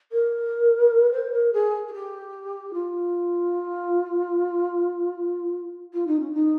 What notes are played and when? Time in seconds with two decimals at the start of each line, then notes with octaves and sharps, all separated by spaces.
0.12 A#4
1.12 C5
1.33 A#4
1.52 G#4
1.87 G#4
1.93 G4
2.73 F4
5.93 F4
6.07 D#4
6.19 C#4
6.32 D#4